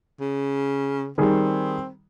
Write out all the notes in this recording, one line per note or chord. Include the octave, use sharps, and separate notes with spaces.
C#3
D#3 G3 C4 G#4